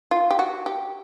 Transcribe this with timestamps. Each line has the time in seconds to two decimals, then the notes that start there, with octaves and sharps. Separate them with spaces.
0.11 F4
0.31 G4
0.39 F#4
0.66 G4